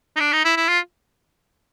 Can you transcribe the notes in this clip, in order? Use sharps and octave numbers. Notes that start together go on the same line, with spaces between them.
D#4
D4
D#4
E4
E4
F4